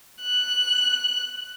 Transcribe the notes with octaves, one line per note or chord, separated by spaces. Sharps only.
F#6